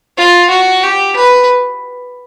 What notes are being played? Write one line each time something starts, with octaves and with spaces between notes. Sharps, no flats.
F4
F#4
G4
B4